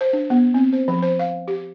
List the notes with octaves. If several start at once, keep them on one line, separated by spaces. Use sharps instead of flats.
C5
D4
B3
C4
C5
F3
C5
F5
G4